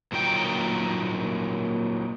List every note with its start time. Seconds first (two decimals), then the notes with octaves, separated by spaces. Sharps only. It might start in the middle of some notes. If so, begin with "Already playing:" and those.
0.12 A#2 F#3 D#4 G5